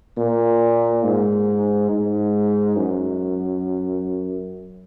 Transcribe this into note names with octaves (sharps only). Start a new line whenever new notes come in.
A#2
G#2
G#2
F#2